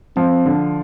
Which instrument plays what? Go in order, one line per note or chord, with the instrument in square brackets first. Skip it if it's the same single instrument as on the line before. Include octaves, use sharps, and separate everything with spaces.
[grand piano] F3 [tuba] C4
[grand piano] D3